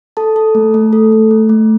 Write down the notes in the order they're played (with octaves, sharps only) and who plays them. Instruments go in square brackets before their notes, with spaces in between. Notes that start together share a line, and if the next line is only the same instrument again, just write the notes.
[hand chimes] A4 A5
A4
A3
A3
A4
A3
A3
A3